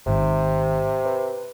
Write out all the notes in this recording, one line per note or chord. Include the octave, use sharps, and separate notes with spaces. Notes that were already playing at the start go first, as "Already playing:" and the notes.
G#1 G#2 C3 D#3
B4